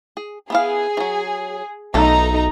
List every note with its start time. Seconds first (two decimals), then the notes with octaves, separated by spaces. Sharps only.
0.17 G#4
0.50 B3 E4 G#4 F5
0.97 E3 F#3
1.94 B1 A3 D#4 F4 A4 A#5